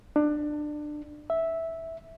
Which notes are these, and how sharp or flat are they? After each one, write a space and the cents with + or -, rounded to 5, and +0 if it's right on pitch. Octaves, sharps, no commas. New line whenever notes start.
D4 +25
E5 -10